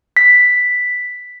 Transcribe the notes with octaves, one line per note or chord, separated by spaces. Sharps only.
B6